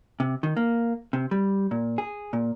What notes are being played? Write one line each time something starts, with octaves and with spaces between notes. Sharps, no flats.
C3
D#3
A#3
C3
G3
A#2
G#4
A#2